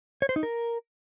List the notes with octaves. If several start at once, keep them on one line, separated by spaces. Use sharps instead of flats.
C#5
C5
D#4
A#4